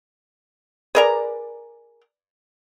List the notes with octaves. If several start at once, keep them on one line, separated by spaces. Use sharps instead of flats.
G#4 A#4 B4 D5 A#5